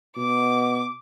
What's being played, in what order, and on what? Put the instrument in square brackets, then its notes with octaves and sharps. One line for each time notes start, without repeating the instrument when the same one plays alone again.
[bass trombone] B2 [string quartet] D6